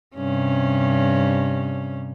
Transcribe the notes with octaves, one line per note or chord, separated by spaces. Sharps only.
G2 C3 C#4